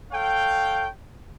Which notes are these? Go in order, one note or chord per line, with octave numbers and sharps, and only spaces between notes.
A4 C#5 F5 G5